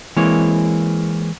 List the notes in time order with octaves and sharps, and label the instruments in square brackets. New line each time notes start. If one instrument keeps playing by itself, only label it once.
[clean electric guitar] E3 G#3 A#3 C4 C#5